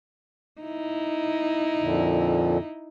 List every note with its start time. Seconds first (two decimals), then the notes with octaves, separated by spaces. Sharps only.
0.62 D#4 E4
1.79 F2 A#2 D3